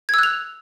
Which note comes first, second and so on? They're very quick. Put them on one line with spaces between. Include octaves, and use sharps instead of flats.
G#6 E6 F#6 F7